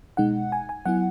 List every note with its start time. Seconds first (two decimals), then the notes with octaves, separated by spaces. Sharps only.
0.17 B2 G#3 D#4 F#5
0.52 G#5
0.69 G#5
0.86 F#3 B3 E4 F#5